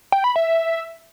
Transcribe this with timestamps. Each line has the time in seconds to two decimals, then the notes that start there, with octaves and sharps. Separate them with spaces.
0.12 G5
0.24 B5
0.36 E5